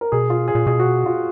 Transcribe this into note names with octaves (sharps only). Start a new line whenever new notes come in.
A#4
B2 G#4
F4
G#4
A#2
B2 G#4
F#4
F4